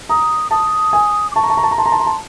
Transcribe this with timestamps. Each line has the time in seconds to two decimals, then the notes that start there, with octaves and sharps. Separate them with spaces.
0.09 A#5 D#6
0.51 A5 D#6
0.93 G#5
1.31 D6
1.35 A5 C#6
1.43 A#5
1.50 A5
1.57 A#5
1.63 A5
1.71 A#5
1.77 A5 C6
1.86 A#5
1.92 A5
2.00 A#5
2.06 A5